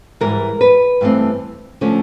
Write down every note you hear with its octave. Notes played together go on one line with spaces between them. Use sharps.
G#2 E3 G3 A#4
B4
G2 E3 A3 C4
D3 F3 A3 C#4